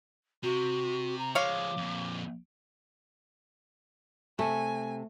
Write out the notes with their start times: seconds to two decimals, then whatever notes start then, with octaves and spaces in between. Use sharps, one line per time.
0.43 C3 F#4
1.18 A#5
1.35 F3 G#3 C#5 F5 D6
1.77 F2 A#2
4.39 C3 A3 A4 G#5